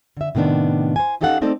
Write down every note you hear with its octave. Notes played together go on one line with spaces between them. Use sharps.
D3 E5
A2 C3 D#3 B3 D4
C5 G#5
C#4 D#4 G4 A4 F5 F#5
A3 C4 D#4 A4 C5 D5